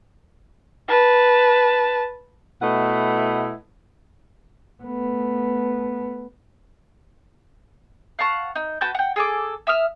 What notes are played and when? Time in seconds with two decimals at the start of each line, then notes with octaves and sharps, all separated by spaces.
0.88 B4 A5
2.62 B2 A3 E4 B4 D#5 F#5
4.83 A3 B3
8.19 F5 F#5 A5 C#6
8.55 D#4
8.81 F#4 B4 A5 G6
8.95 F#5 G5
9.16 G#4 A4 D6
9.67 E5 D#6 F6